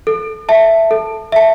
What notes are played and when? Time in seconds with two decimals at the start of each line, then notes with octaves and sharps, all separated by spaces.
0.07 A4
0.49 E5 A5
0.91 A4
1.32 E5 A5